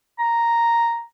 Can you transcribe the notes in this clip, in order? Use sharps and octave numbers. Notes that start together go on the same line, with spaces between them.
A#5